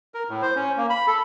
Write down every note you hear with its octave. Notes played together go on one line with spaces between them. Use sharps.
A#4
A2
C5
C#4
A#3
B5
A4